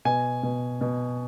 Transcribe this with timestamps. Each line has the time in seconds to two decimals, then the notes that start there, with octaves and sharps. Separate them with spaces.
0.05 B2 G#5
0.43 B2
0.81 B2